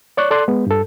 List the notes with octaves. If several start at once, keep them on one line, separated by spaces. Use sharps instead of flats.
C#5 D5 C#6 F#6
A4 D5 C6 F#6
G#3 B3
G2 A4